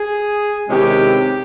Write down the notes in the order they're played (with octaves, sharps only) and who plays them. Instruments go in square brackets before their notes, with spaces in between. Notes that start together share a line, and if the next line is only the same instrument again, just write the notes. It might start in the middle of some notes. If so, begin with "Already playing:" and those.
Already playing: [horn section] G#4
C3 D#3 G#3 C#4 E4 G4